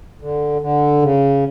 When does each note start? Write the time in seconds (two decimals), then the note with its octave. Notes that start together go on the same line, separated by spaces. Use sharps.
0.21 D3
0.62 D3
1.02 C#3